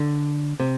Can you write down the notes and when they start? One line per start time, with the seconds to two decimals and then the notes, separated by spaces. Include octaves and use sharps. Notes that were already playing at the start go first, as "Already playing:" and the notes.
Already playing: D3
0.60 C3